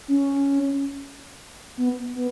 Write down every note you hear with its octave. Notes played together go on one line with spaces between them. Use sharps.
C#4
B3
B3